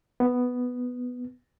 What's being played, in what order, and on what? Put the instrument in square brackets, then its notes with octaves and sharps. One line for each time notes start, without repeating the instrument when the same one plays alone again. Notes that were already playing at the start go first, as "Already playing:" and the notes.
[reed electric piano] B3